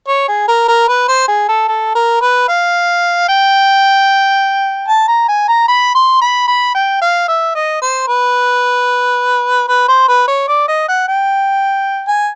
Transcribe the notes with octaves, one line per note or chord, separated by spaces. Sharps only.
C#5
G#4
A#4
A#4
B4
C5
G#4
A4
A4
A#4
B4
F5
G5
A5
A#5
G#5
A#5
B5
C6
B5
B5
G5
F5
E5
D#5
C5
B4
B4
C5
B4
C#5
D5
D#5
F#5
G5
G#5